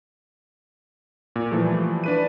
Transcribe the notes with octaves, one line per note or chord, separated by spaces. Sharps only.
A#2
E3 F3 G3 A3
D4 B4 D#7